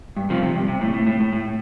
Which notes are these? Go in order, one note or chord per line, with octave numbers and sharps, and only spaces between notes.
G2
C3 F3
C3
G2
C3
A2
A2
A2
A2
A2